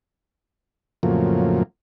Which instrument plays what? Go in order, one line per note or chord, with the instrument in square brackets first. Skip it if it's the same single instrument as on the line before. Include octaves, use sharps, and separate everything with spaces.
[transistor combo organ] F2 A2 C#3 F3 F#3 A#3